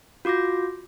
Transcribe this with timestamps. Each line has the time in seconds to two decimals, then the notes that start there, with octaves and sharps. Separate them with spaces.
0.25 F4 F#4 D6 G6 A#6